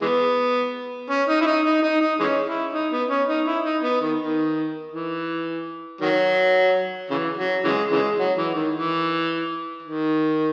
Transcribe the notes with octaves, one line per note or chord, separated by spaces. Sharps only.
E3 G#3 B3
C#4
D#4
E4
D#4
D#4
D#4
D#4
E3 G#3 C#4
E4
D#4
B3
C#4
D#4
E4
D#4
B3
D#3
D#3
E3
D#3 F#3
C#3 E3
F#3
C#3 E3 G#3
C#3 E3 G#3
F#3
E3
D#3
E3
D#3